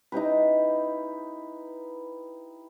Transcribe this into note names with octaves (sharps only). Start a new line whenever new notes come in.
D#4 E4 G4 B4